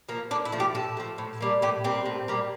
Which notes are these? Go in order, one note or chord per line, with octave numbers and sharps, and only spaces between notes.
F3 A#3
A2 D4
E4
F3 A3
G4
A2 A4
F3 A3
A2
G3 A#3
A2 G4
G3 A#3 C4
A2
G3 A#3